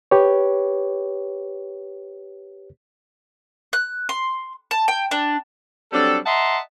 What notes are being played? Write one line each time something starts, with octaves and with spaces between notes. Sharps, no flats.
G4 B4 C#5
F#6
C6
A5
G5
D4
F#3 G3 C4 D4 A4
D#5 E5 F#5 A5 A#5 C6